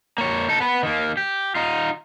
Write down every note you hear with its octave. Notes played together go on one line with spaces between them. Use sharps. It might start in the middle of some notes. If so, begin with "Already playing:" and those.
A#3 C#5
D#4 A4
B3 B4
D#3 A#3
G4
D#4 F4